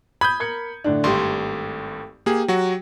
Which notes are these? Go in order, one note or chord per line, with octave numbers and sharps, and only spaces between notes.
B5 D#6 G6 G#6
A#4 G#6 C#7
A2 D3 D4
G#1 G2 A3 G4 C6
A#3 G4 G#4
F#3 F#4